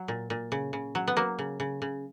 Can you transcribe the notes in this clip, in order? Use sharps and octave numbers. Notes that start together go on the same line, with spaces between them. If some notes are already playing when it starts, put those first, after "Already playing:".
Already playing: F#3
A#2
A#2
C#3
C#3
F#3
B3
F#3 A#3
C#3
C#3
C#3